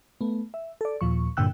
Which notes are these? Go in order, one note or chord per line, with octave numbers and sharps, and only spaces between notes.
A3 B3
E5
A4 D5
D#2 A#2 F3 C#6
G2 A#2 D3 G5 E6 F#6